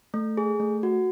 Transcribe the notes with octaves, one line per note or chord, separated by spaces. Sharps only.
A3
G#4
A3
F#4